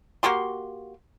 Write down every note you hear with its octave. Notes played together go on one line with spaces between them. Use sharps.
A#3 F#4 G4 C6